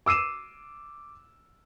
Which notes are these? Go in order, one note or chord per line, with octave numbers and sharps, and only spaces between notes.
D6 E6 C7 D#7 E7